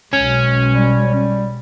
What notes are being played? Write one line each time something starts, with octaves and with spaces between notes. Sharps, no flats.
B1 G#3 C#4
G3